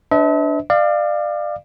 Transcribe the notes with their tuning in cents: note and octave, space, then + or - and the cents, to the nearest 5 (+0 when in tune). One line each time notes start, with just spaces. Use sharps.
D4 -5 B4 +45 E5 -45
D5 +30 F5 -10